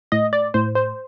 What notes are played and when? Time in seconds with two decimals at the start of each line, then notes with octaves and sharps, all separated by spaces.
0.12 A2 D#5
0.33 D5
0.54 A2 C5
0.75 C5